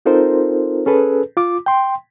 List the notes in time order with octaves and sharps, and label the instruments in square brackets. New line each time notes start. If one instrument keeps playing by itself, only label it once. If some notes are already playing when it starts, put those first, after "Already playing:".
[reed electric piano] C4 D#4 F4 A4 A#4 C5
C#4 G#4 A4 B4
F4 D6
G5 C6